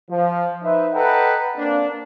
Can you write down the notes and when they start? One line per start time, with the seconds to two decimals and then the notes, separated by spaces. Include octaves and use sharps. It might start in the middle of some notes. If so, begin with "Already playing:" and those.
0.11 F3
0.63 D#4 B4 C5 E5
0.94 A4 B4 D#5 F#5 G5 A#5
1.58 A#3 C4 D4